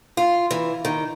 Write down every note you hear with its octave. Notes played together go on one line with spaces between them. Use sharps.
F4
E3
D#3